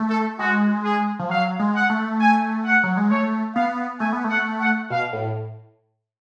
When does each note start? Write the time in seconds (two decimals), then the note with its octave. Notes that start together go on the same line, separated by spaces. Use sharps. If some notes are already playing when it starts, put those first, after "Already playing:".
Already playing: A3
0.09 A4
0.39 G#3 F#4
0.84 G#4
1.19 F3
1.29 F#3 F5
1.59 G#3
1.75 F#5
1.90 A3
2.20 G#5
2.65 F#5
2.84 F#3
2.97 G#3
3.10 A3 C#5
3.55 B3 F5
4.00 A3 G#5
4.13 B3
4.24 A3
4.30 F#5
4.61 F#5
4.90 B2 F5
5.13 A2